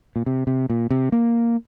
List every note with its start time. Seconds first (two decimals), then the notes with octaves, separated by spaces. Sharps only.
0.16 A#2
0.26 C3
0.47 C3
0.70 A#2
0.91 C3
1.12 A#3